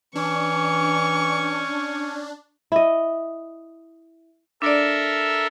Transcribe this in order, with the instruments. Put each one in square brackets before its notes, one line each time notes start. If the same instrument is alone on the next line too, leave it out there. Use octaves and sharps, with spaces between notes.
[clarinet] E3 [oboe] C#4 [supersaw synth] D4 [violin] C#6
[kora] E4 D#5
[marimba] D4 D5 [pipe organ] A4 A#4 E5